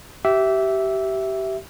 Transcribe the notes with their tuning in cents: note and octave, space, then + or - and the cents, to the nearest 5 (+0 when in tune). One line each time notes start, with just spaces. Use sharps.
G4 -25 E5 +0